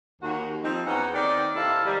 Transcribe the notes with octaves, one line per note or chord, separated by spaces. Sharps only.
D#2 F#4
F3 C4 D#4
E2 C#4 D#4 F#4 B4 F#5
D#2 D#3 C4 D5
C3 C4 E4 A4 D#5 F5
D#3 G3